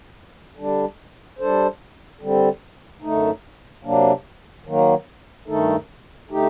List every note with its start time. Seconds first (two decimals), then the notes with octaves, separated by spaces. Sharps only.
0.56 D3 G3 D4
1.39 G3 D4 A4 C5
2.21 D3 G3 C4
3.02 F#2 D3 A3 D#4
3.84 C3 F#3 A#3 D4
4.66 D#3 F#3 A#3
5.48 G2 D#3 A3 D#4 A4
6.30 D3 A3 D#4 G4